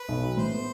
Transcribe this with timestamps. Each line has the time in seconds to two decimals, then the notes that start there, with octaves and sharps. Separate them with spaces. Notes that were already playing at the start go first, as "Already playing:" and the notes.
Already playing: B4
0.08 B1
0.23 F#3
0.37 A2 C5
0.52 B3